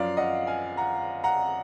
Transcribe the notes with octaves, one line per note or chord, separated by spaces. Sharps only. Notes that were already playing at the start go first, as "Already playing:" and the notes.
Already playing: F#2 F3 D5 F5
D#5 F#5
F5 G#5
F#5 A#5
F#5 A#5